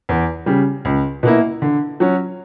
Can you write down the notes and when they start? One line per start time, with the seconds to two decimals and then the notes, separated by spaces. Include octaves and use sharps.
0.09 E2
0.46 C#3 G3
0.85 C#2
1.23 B2 A#3 E4
1.62 D3
2.00 F#3 C#4